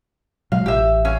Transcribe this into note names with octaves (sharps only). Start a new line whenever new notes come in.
B2 F#3 G#3 F5
A1 G4 E5
C#4 F5